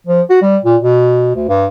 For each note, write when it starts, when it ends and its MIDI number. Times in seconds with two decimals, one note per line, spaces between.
0.07 0.21 53
0.30 0.40 66
0.42 0.57 55
0.64 0.76 46
0.81 1.32 47
1.35 1.45 38
1.48 1.66 43